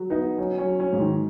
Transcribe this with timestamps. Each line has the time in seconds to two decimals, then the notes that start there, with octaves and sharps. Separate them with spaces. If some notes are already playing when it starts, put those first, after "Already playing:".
Already playing: F#3
0.10 B3 D#4
0.38 F#3 C#4
0.58 C#4
0.65 F#3
0.80 C#4
0.93 G#2
1.00 D#3